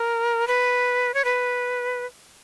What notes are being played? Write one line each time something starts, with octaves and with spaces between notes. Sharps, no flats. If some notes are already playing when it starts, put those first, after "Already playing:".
Already playing: A#4
B4
C#5
B4